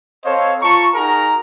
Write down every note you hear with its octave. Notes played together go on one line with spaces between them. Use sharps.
C4 A4 C5 C#5 D#5 F5
F4 A5 A#5 C#6
D#4 F#4 G#4 A#4 A#5